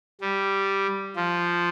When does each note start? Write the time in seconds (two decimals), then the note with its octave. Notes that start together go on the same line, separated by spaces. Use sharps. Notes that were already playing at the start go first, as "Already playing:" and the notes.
0.21 G3
1.16 F3